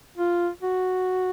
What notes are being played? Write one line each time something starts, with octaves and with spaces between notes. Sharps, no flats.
F4
F#4